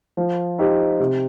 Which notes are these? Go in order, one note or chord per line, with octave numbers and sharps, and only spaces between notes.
F3
D#4 G4 C5
C3